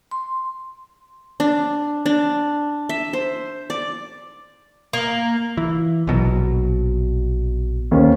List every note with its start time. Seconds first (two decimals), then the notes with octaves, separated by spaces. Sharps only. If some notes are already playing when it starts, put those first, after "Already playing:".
0.11 C6
1.40 D4
2.06 D4
2.89 E5
3.13 C5
3.70 D5
4.93 A#3
5.57 E3
6.07 A#1 B2 F#3
7.91 D#2 C#4 C5